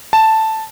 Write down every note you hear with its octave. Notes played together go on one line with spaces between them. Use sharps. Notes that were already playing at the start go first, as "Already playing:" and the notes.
A5